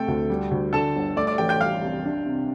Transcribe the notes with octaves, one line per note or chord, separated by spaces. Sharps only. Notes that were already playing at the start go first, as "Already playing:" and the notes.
Already playing: C3 A3 A4 G5
D2
G3
D2
D3 A4 A5
G1
A3 D5 D6
D5 D6
A1 G5
G5 G6
G3 F5 F6
C2
D4
C3